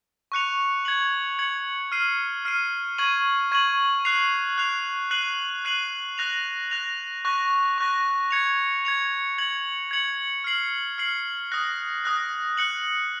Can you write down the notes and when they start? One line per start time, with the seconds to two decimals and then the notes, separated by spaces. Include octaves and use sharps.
0.32 C#6 F#6 C#7 F7
0.85 G#6 C#7 F#7
1.39 G#6 C#7 F#7
1.92 F6 C7 D#7
2.45 F6 C7 D#7
2.98 C#6 G#6 D#7 F#7
3.52 C#6 G#6 D#7 F#7
4.05 F#6 C7 F7
4.58 F#6 C7 F7
5.11 F#6 C7 D#7 F#7
5.65 F#6 C7 D#7 F#7
6.18 F#6 A#6 F7
6.71 F#6 A#6 F7
7.25 C#6 F#6 A#6
7.78 C#6 F#6 A#6
8.31 G#6 C#7 F7
8.85 G#6 C#7 F7
9.38 G#6 C#7 F#7
9.91 G#6 C#7 F#7
10.44 F6 C7 F#7
10.98 F6 C7 F#7
11.51 D#6 F#6 A#6
12.04 D#6 F#6 A#6
12.57 F#6 C#7 F#7